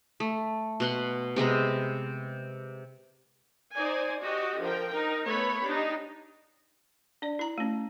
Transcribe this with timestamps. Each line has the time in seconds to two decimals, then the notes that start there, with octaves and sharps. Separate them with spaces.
0.20 A3
0.80 B2 F#5 C6
1.36 C3 G#3 B3 A#5
3.75 D#4 C5 D5 G#5
4.20 F#4 G4 D#5
4.60 D3 F3 A#4 G5
4.91 D#4 A#4
5.26 A3 B3 B4 C#5 B5
5.62 D4 D#4 G4
7.22 D4 D5
7.39 E4 A#5
7.58 A3 C#4